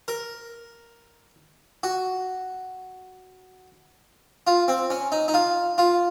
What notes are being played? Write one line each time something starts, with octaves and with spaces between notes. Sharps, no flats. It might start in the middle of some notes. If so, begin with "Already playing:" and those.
A#4
F#4
F4
C4
C#4
D#4
D#4
F4
F4